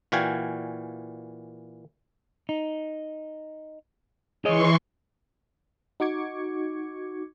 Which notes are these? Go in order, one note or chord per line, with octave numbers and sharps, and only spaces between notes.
A#2 E3 F#4 F5 G5 G#5
D#4
E3 G#4 C#5 D#5 C6 C#6
D#4 F#4 C#6 D6 G#6 C#7